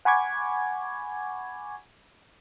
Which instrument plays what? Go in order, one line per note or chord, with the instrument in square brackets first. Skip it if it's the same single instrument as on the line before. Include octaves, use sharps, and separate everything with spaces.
[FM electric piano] F#5 G#5 B5 C#6 D6 G#6